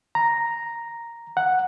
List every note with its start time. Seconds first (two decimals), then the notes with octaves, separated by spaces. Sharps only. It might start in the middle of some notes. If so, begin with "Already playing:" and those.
0.15 A#5
1.37 F#5